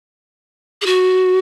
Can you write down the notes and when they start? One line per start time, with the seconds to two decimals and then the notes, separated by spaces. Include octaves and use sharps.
0.82 G#4
0.86 F#4